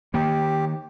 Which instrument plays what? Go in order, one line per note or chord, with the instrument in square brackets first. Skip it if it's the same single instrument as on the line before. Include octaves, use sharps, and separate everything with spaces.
[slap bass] D#3 A#3 [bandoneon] G4